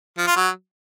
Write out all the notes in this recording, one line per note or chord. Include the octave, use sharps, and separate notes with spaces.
F3
F4
F#3